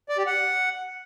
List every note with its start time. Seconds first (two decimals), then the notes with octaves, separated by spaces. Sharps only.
0.09 D5
0.18 G4
0.26 F#5